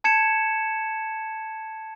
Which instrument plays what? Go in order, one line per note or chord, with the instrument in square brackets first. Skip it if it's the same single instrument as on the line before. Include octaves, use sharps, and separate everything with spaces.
[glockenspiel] A5 G#6 C#7 E7